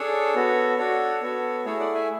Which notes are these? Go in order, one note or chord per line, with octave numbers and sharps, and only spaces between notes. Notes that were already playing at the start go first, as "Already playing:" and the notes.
Already playing: D4 G#4 A4 C#5
B3 F#4 A4
D4 F#4 A4 C#5
B3 F#4 A4
A3 E4 G#4 A4 C#5
D5 F#5
E5 G#5